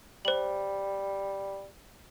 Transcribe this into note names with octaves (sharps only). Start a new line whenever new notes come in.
G3 C5 F#7